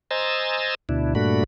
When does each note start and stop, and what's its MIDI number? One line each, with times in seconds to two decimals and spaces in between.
0.11 0.75 72
0.11 0.75 75
0.11 0.75 80
0.11 0.75 82
0.11 0.75 88
0.11 0.75 93
0.89 1.14 38
0.89 1.14 47
0.89 1.14 62
0.89 1.14 64
1.15 1.44 43
1.15 1.44 46
1.15 1.44 57
1.15 1.44 62
1.15 1.44 66
1.15 1.44 83